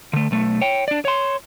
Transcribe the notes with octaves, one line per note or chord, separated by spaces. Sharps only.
D3 A3
B1 A3
C#5 G5
D4 D5
C#5 C6